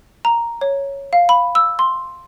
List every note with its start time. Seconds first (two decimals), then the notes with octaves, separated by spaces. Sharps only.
0.25 A#5
0.61 C#5
1.13 F5
1.29 B5
1.55 E6
1.79 C6